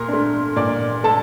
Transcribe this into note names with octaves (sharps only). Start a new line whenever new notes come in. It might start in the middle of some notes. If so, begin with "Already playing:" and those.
Already playing: A#2 A#4 C6
A3 D4
A#2 D5 D6
A3 A4 A5